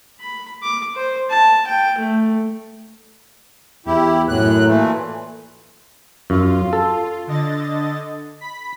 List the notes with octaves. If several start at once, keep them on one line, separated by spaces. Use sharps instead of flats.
B5
D6
C5
A5
G5
A3
E2 E4 G4
F#2 A2 F#3 F#6
A#2 E3 A3
F#2 F4
A4
D3 D#5 A6
B5 B6